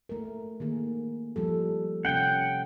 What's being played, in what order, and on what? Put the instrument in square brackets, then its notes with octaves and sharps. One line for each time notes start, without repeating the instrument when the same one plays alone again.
[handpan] A3 A#4
D#3 A#3 G#4
F3 G3 A4
[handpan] C3 C#4 [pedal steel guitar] F#5 G5